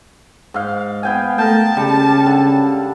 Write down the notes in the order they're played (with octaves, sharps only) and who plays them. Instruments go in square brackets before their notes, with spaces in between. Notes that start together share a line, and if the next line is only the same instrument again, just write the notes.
[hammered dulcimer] G#2 F5
B3 G5 G#5
[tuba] A3 [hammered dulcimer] A#4 G5 [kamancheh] A5
[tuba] C#3 [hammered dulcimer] G3
[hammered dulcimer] D3